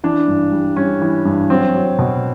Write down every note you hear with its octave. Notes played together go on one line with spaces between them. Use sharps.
E3 D4
G2
G3
G3 C#4
E3
G2
F#3 C4
F#3
B2